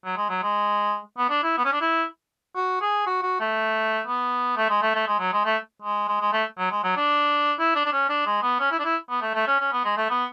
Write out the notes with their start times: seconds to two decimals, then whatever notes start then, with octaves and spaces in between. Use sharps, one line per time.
0.05 F#3
0.17 G#3
0.30 F#3
0.43 G#3
1.18 B3
1.30 D4
1.43 E4
1.58 B3
1.65 C#4
1.73 D4
1.81 E4
2.56 F#4
2.82 G#4
3.07 F#4
3.23 F#4
3.40 A3
4.07 B3
4.57 A3
4.70 G#3
4.82 A3
4.95 A3
5.08 G#3
5.20 F#3
5.33 G#3
5.46 A3
5.82 G#3
6.08 G#3
6.21 G#3
6.33 A3
6.58 F#3
6.71 G#3
6.84 F#3
6.97 D4
7.59 E4
7.76 D4
7.86 D4
7.92 C#4
8.09 D4
8.26 G#3
8.43 B3
8.60 C#4
8.71 E4
8.80 D4
8.85 E4
9.10 B3
9.22 A3
9.35 A3
9.47 C#4
9.60 C#4
9.72 B3
9.85 G#3
9.97 A3
10.10 B3